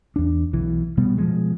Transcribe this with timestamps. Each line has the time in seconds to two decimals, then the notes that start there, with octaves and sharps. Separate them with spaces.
0.16 E2 D4
0.53 B1 E3
0.97 B2 G3 B3
1.18 B2 F3 G#3